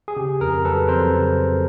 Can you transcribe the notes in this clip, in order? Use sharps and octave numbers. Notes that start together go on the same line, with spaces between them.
G#4
C#3 G4
F2 G#4 A#4
F#3 A4 B4
F2 A#4 C5
C#3
F2